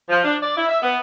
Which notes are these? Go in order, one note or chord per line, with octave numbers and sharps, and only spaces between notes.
F3
D4
D5
E4
E5
B3